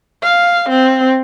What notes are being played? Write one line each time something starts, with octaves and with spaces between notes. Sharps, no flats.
F5
C4